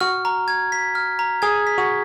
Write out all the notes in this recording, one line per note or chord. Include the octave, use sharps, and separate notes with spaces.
F#4 F6
A#5
G#6
B6
F6
A#5
G#4 G#6
B6
F#4